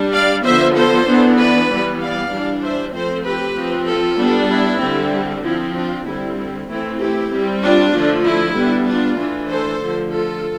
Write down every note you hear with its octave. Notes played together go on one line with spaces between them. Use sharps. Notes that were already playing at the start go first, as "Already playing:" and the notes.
Already playing: G3 D4
D5 F5
D3 F3 B3 C5 E5
A4 C5
E3 B3 D4
B4 D5
E3 G3 B3
D5 F5
E3 G3 D4
C5 E5
F3 A3 C4 A4 C5
G4 B4
F3 C4
F4 A4
G3 B3 D4
E4
D3 G3 C4
F3 C4 E4
D4 F4
D3 G3 C4 E4
E4
E3 A3 C4 E4
E4 G4
C4
G3
D4 F4
D3 F3 A3
E4
G3 B3 D4
D4 F4
E3 A3 D4
A4 C5
D3 F3 A3
F4 A4